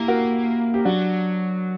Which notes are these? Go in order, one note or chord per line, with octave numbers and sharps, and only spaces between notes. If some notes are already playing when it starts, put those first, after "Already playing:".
Already playing: A#3 E4 G4
F#4 A#4
G4
F#3 D4 F#4